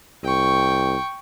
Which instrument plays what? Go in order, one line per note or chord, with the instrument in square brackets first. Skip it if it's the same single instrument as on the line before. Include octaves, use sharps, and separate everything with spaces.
[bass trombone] C2 [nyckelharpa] G5 C#6